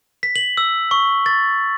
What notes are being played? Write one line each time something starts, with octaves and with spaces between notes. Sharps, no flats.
B6
F#7
E6
C#6
A6